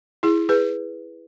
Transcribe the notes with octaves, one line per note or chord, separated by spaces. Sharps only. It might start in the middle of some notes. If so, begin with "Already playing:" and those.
E4 G#4
G#4 B4